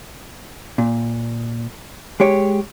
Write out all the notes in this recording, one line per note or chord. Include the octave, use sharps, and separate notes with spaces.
A#2
G#3 G4 C#5